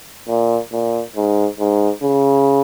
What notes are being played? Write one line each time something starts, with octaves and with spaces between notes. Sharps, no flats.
A#2
A#2
G#2
G#2
C#3